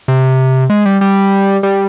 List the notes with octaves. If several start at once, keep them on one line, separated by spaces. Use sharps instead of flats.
C3
G#3
G3
G3
G3